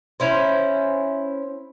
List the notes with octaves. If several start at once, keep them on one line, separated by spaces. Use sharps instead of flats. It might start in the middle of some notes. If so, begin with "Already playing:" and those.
C#4 E4 C5